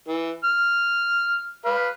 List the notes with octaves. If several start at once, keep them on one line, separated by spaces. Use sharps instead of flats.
E3
F6
B4 F5